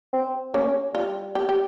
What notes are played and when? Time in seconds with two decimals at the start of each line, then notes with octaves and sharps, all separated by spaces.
0.13 C4
0.54 A#3 C#4
0.67 C#4
0.94 G3 F4
1.35 G4
1.49 G4